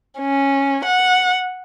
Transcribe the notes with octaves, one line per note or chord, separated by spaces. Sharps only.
C#4
F#5